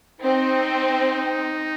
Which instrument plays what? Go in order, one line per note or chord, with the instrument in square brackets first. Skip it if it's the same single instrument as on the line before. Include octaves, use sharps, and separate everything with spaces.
[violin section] C4 [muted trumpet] D#4